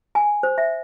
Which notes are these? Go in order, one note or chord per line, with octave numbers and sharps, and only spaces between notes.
G#5
C5
E5